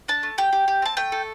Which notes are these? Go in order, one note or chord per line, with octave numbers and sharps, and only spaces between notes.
D4 A5
A3
G4 G5
G4
G4
C4 A5
A3 G5
A4